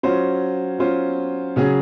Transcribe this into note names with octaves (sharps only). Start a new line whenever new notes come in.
F#3 C#4 F4 C5
F#3 C#4 F4 C5
C#3 F#3 C#4 G#4